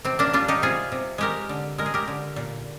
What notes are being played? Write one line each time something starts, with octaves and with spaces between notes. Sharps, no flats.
C3 C4
A#3 D4
G3 D4 F4
D#4 G4
C3 F4 G#4
C3
G#3 G4 A#4
D3
G#3 A#4
G#4
G4 A#4
D3
A#2